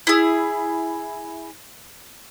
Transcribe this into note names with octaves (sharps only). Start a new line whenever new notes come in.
E4 G#4